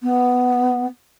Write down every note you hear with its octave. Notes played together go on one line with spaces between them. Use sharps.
B3